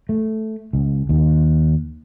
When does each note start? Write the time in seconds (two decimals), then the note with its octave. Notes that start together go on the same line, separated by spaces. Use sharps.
0.09 A3
0.73 C#2
1.09 D#2